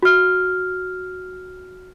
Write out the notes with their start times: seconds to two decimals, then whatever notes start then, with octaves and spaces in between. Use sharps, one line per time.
0.03 F#4 F6